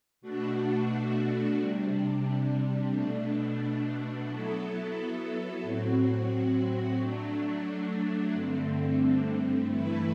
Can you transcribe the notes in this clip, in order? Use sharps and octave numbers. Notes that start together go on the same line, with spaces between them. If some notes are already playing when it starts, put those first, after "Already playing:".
B2 A3 D4 F#4
C3 G3 D4
B2 A3 D4
F#3 B3 E4 A4
A2 F#3 C4 F#4
F#3 A3 D4
G2 D3 A3 C4
G2 E3 A3 E4 B4